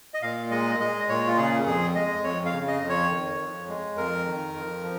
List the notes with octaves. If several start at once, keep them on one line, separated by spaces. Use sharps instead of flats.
D#5
A#2 F5
G#3 D#5
G#3 D#5
A#2 C#5
F4
C#3 G#4
F2 G#4
G#3 D#5
F2 C#5
F5
C#3
D#5
F2
C#5
D#3
F2
G#3
F2 A#4
D#3
F2
F3